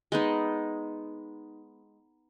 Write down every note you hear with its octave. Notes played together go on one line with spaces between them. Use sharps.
G#3 B3 D#4